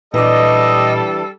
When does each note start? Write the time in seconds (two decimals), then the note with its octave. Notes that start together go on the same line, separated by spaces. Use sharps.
0.14 A#2 E3 G3 D4 A4 D#5 D6